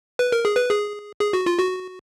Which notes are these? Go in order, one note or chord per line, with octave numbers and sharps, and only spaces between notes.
B4
A#4
G#4
B4
G#4
G#4
F#4
F4
F#4